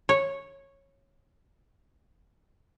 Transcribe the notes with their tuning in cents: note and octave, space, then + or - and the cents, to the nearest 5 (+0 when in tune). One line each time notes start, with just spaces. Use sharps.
C#5 -10